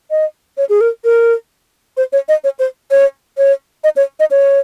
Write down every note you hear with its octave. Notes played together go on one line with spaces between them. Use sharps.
D#5
C#5
G#4
A#4
A#4
C5
C#5
D#5
C#5
C5
C#5
C#5
D#5
C#5
D#5
C#5